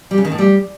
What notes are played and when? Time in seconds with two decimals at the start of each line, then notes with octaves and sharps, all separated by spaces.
0.11 G3
0.18 C#3
0.25 D#3
0.32 A2
0.38 G3